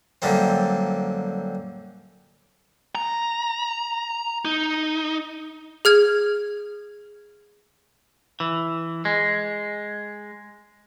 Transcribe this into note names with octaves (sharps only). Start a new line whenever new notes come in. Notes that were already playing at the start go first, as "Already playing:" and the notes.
F#2 D3 G3 A#3 C4
A#5
D#4
G#4 F6 G#6
E3
G#3